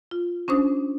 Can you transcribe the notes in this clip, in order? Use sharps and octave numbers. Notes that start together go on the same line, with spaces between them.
F4
C#4 D4 C5 D#6